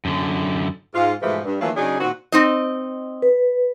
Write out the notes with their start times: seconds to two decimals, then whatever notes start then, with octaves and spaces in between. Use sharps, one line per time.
0.05 F#2 D3
0.94 G#2 F4
1.23 G#2 B2 E3 F3 G#3 A3
1.45 G2
1.61 D#3 E3 F#3 A3 A#3 F4
1.77 C#3 F#3 D4 D#4 G#4
2.00 A#2 D#3 C4 F#4
2.32 C4 D#4 D#5
3.22 B4